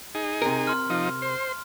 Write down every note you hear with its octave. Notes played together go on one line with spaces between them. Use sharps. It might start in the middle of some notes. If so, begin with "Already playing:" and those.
D#4 G#4
C3 A#4
C6 F6
F3 D#4
C5